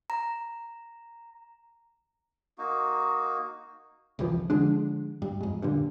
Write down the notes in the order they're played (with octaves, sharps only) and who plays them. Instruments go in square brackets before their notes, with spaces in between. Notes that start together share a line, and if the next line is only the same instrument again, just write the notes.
[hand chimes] A#5
[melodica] A#3 D#4 F#4
[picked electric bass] C2 F2 E3 F3
D3 F3 G#3 D4
G2
F2 G#2
G2 A#2 D3